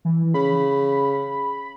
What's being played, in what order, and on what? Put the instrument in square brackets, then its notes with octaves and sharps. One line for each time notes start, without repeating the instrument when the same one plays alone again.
[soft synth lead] E3
[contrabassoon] C#3 [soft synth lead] B5